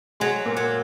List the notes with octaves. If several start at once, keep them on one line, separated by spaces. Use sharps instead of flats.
F#3 G#3 G#4
A#2 A#3
F#3